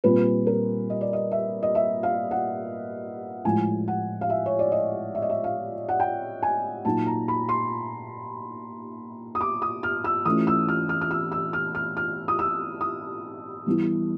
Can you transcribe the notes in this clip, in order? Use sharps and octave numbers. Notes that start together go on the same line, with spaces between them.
A#2 G3 C4 B4
A#4
D#5
D5
D#5
E5
D#5
E5
F5
F#5
A2 F3 G#3 G#5
F#5
F5
E5
C#5
D5
D#5
E5
D#5
E5
F5
F#5
G5
G#5
A#2 F#3 A#3 D#4 A5
A#5
B5
C6
D#6
D6
D#6
F6
E6
E3 A3 C#4 F4 D#6
E6
F6
F6
F6
E6
E6
F6
F6
F6
D#6
E6
D#6
E3 G3 B3 E4